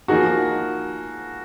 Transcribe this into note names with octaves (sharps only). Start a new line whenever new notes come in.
F3 A#3 D#4 F#4 G#4